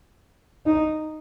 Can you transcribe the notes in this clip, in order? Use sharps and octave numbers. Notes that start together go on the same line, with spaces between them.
D#4